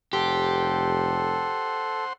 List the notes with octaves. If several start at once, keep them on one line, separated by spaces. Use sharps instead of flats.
F1 G4 A4 C5 F#5 C6